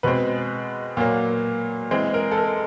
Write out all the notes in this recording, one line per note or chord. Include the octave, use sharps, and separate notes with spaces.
B2 G#3 C4 B4
A#2 F#3 A#3
E3 G#3 C4
A#4
A4
A#4